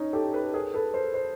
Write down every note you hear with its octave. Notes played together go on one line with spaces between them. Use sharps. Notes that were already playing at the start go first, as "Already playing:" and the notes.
Already playing: C#4 D#4
G4 A4
A4 B4
G#4 A#4
A4 B4
A#4 C5
C5